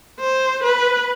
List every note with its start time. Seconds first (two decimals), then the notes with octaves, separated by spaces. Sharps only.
0.20 C5
0.63 B4